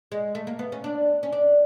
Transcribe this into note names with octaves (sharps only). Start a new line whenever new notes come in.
G#3
A3
A#3
B3
C#4
D4
C#4
D4